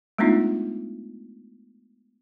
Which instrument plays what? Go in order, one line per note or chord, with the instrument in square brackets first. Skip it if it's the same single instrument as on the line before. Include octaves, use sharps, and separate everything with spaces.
[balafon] G#3 A3 B3 D4 D#4 F4